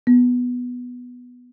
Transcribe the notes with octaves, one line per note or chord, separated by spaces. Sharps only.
B3